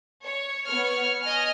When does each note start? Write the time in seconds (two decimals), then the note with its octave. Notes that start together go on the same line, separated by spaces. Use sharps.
0.23 C#5
0.66 B3 C#5 F6
1.22 D#5 G#5 F6